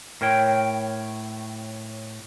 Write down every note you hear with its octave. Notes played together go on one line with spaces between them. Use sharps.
A2 A#4 C#5 G5